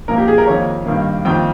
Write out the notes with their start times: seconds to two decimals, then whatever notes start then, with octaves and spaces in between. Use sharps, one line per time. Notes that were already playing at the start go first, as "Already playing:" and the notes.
0.08 A#2 F3 A#3 A#4
0.18 G4
0.28 G#4
0.38 A#4
0.47 F2 D#3 A#3 C#5
0.86 G2 D#3 A#3
1.25 F2 D#3 A#3 G5